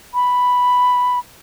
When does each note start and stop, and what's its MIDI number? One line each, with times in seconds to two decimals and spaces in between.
0.14 1.19 83